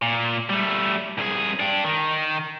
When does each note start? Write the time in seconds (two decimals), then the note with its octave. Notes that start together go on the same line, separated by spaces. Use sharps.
0.02 A#2
0.50 G3 A3
1.19 C2 G#4
1.60 D4 G4
1.85 D#3